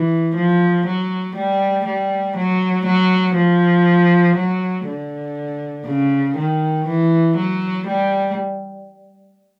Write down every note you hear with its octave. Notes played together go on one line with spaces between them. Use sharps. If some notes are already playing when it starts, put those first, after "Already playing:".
Already playing: E3
F3
F#3
G3
G3
F#3
F#3
F3
F#3
D3
C#3
D#3
E3
F#3
G3